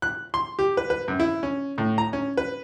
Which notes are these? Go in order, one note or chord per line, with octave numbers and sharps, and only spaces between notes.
F#6
C6
G4
B4
B4
F#2
E4
C#4
A2
A#5
C#4
B4